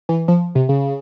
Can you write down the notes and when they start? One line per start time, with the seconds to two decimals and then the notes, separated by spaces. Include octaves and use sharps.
0.09 E3
0.28 F3
0.55 C3
0.69 C#3